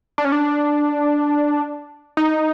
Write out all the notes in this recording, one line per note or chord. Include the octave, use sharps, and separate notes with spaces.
D4
C#4
D4
D#4